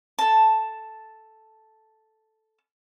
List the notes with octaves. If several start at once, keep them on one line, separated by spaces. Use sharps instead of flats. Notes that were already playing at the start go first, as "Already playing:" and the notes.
A4 A5